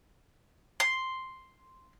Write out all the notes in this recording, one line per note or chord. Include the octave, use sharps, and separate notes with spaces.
C6